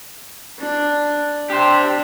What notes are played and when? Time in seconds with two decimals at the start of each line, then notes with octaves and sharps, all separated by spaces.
0.59 D4
1.50 D4 G4 C5